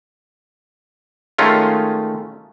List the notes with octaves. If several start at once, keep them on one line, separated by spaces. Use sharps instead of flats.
D#3 G#3 A3 C#4 F4